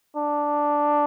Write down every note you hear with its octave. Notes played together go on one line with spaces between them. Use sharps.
D4